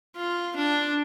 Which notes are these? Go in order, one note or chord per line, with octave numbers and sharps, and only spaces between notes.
F4
D4